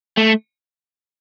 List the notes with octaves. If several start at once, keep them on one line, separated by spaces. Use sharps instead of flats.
A3